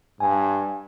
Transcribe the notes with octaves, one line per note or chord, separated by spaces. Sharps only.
G2 G#5